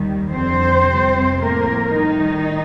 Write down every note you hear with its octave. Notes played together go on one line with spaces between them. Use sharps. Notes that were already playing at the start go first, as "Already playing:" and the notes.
Already playing: D#2 D#3 G3
F2 D3 G3 C4 C5
F2 C3 G3
A2 F3 A3 A#3 A#4
A2 D#3 G3 D#4